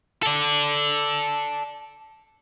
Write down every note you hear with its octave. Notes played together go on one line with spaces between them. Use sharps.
A4 D5